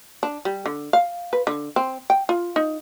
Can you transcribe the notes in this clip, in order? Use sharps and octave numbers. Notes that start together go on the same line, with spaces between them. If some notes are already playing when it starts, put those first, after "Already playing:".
D4
G3
D3
F5
B4
D3
C4
G5
F4
D#4